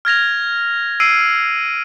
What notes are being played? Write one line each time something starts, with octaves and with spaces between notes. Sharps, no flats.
F6 G#6 A#6 F7
E6 C7 D7 D#7